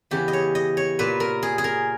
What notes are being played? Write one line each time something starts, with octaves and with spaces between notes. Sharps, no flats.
E2 C#3 E3 G4
D#5
C#5
D#5
C#5
A#2 B4
A#4
G#4
G#4
A#4